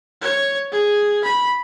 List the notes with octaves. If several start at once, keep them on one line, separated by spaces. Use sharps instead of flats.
C#5
G#4
B5